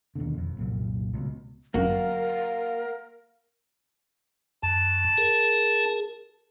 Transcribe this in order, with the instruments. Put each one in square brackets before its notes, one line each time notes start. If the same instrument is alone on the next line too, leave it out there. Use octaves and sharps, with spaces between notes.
[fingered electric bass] D#2 B2 D3
E1 F2
C2 F#2 A#2
C#2 B2
[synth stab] G1 F#2 [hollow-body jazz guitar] A#3 F#4 [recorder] A#4 [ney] F5
[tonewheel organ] F#2 [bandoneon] A5
[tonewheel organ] G#4 A#4